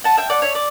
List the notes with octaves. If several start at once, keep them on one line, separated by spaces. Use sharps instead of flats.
F#5 A5
E5 G5
D5 F#5
C#5 E5
D5